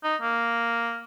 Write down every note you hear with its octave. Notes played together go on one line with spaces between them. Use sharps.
D#4
A#3